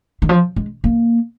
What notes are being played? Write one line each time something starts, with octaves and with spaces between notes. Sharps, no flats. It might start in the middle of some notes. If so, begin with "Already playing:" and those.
D#3
F3
G#3
A#3